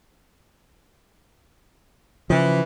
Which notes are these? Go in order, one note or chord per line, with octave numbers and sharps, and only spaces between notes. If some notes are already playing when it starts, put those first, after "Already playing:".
C#3 E3 F3